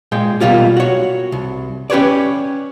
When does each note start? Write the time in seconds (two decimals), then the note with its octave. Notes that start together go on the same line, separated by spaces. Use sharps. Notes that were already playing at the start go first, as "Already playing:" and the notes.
0.12 A#2 G#3 G5
0.40 B2 G3 A#3 F4 G4
0.77 F#4 C#5
1.32 C2
1.90 C#4 G4 B4 C#5 D5